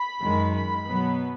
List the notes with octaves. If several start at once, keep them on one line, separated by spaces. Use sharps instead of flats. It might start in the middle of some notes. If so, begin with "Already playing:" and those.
Already playing: B5
F#2 D#3 G#3
B5
B2 F#3 B3